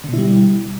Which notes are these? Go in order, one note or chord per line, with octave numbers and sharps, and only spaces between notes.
B2 D3 G3 E4